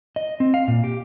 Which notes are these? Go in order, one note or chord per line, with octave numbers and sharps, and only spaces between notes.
D#5
C4
F5
A#2
G4